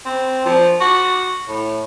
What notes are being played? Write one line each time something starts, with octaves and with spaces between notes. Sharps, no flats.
C4
F3
F#4
A2